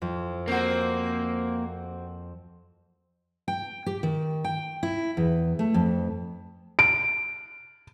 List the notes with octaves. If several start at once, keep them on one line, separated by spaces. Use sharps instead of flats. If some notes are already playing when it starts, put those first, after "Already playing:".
F2
A#3 C4 F#4
G5
G4
D#3
G5
E4
E2
A3
F2
D7